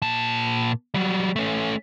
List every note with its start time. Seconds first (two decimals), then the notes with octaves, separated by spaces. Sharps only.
0.02 A#2 A5
0.94 F#3 G3
1.36 A3 C#4